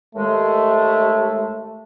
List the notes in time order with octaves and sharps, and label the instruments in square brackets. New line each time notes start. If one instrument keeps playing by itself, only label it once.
[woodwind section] D#2 G#3 [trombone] A3